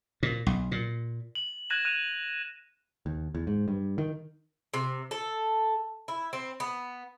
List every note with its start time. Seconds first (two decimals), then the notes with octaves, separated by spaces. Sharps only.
0.23 A#2
0.47 B1
0.71 A#2
1.35 F#7
1.70 F#6 G#6 A#6 D#7 E7 F#7
1.85 F#6 D#7 F7
3.06 D#2
3.35 E2
3.47 G#2
3.68 G2
3.98 D#3
4.74 C3
5.11 A4
6.08 E4
6.33 C4
6.60 B3